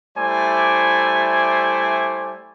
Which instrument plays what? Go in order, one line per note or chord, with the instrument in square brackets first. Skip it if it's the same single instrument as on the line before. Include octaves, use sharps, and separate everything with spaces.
[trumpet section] G3 A3 E4 C5 D5 G#5